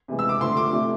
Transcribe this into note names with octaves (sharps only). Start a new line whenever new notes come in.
C3 E3 G#3
E6
D6
D3 F3 A3 C6
D6
C3 F3 A3